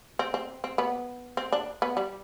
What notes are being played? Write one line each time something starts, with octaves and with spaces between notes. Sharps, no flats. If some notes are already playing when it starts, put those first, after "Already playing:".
C4
C4
C4
B3
C4
D4
B3
G3